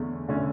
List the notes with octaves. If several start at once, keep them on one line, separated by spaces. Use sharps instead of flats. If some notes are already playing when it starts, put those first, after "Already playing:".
Already playing: E2 D3 A3 C#4
D3 A3 C#4